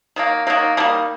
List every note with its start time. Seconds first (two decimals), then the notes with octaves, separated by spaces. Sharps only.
0.16 D#3 F#3 A#3
0.47 D#3 F#3 A#3
0.77 D#3 G3 A#3